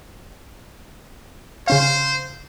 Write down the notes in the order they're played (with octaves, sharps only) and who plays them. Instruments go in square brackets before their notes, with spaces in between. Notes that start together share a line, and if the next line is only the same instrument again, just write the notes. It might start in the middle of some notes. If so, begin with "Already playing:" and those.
[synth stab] C#3 C#4 F5 [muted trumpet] C5